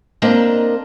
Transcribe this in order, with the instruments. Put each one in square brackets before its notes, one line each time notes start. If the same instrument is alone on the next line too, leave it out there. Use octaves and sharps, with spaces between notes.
[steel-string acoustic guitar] A#3 C4 D4 A#4 D#5 A5